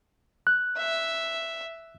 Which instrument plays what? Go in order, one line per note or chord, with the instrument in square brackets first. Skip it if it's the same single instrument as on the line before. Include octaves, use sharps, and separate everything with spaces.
[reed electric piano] F#6
[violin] E5